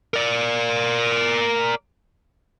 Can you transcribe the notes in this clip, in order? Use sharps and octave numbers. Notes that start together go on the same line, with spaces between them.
A#4 D5